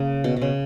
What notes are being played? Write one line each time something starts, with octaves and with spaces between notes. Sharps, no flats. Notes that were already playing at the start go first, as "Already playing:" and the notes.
Already playing: C#3 A#3
B2
B2
C#3